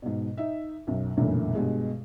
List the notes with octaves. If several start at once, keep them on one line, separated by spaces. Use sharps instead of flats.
G#2 B2
D#4 E5
B1 F#2
F1 B1 F#2 A#2 D3 E3
G2 B2 G#3